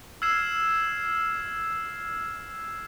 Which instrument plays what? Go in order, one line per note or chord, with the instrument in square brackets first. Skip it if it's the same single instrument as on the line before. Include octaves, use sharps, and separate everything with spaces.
[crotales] E6 F6 G#6 C7 E7